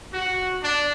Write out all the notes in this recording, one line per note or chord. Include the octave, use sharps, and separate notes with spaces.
F#4
D4